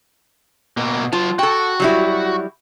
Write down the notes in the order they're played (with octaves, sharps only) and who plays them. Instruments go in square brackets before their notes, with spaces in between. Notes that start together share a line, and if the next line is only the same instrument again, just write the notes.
[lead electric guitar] B2 A#3
[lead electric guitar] F#3 A5 [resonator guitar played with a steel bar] F4
[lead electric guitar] F#4 [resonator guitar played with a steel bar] A4 G5
[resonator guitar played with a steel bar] F#3 G3 E4